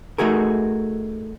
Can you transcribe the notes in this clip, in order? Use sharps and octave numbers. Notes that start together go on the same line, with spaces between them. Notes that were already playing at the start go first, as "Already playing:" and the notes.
A3 D#4 F#4 G#4 A#4